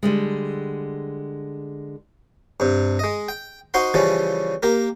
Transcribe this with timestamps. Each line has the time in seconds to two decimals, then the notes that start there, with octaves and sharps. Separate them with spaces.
0.03 D3 G3 G#3
2.60 G2 C3
2.99 G#3 D#5
3.29 G5
3.74 D#4 F#4 C5 F#5 C6
3.94 C#3 E3 F3 G3 C#4
4.63 A#3 G4 A#4